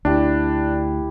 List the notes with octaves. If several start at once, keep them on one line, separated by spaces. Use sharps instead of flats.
D2 D4 E4 G4